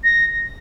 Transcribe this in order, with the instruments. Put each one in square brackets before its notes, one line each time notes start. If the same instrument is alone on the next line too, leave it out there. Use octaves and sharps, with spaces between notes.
[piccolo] A#6